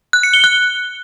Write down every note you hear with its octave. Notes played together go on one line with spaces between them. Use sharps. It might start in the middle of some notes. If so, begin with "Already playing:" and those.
F#6
C#7
G7
F#6